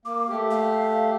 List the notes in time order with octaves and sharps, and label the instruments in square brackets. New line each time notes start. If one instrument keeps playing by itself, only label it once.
[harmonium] A#3 [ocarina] D6
[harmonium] A3 G4
[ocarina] F5